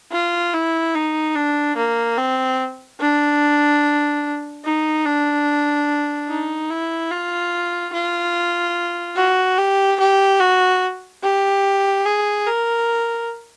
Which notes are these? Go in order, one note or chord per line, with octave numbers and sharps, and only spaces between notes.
F4
E4
D#4
D4
A#3
C4
D4
D#4
D4
D#4
E4
F4
F4
F#4
G4
G4
F#4
G4
G#4
A#4